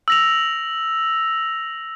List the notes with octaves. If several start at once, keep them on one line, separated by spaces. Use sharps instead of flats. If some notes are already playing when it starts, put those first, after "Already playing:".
E6 A#6 F7